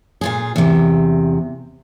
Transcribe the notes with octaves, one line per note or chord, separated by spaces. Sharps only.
A#2 F4 G#4
E2 C3